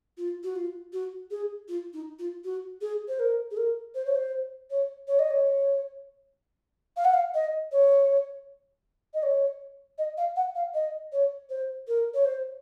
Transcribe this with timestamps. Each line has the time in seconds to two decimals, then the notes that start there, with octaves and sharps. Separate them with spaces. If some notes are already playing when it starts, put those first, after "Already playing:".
0.17 F4
0.43 F#4
0.55 F4
0.92 F#4
1.30 G#4
1.68 F4
1.93 D#4
2.19 F4
2.44 F#4
2.81 G#4
3.08 C5
3.19 A#4
3.51 G#4
3.56 A#4
3.94 C5
4.05 C#5
4.15 C5
4.70 C#5
5.07 C#5
5.19 D#5
5.30 C#5
6.96 F5
7.04 F#5
7.13 F5
7.34 D#5
7.72 C#5
9.14 D#5
9.22 C#5
9.98 D#5
10.17 F5
10.36 F#5
10.55 F5
10.74 D#5
11.12 C#5
11.49 C5
11.87 A#4
12.14 C#5
12.25 C5